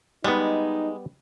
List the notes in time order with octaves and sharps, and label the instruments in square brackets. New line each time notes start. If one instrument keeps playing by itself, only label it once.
[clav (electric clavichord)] G3 B3 [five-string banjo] G#3 [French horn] D#4